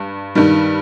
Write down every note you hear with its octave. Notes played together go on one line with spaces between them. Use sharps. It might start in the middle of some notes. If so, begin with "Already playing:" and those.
Already playing: G2
G2 D#3 G3